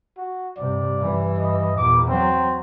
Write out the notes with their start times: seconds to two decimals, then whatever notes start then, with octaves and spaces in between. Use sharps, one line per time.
0.17 F#4
0.57 G2 C3 D5
0.97 G2 E3
1.38 D#5
1.77 E2 A#2 D6
2.09 F#3 C4